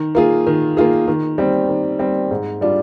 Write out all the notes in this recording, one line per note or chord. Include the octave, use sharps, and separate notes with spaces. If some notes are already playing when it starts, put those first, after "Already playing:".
Already playing: D#3
A#3 F4 G#4
D#3
A#3 F4 G#4
D#3
G3 C4
D#3
G3 C4
G#2
G3 D4 F4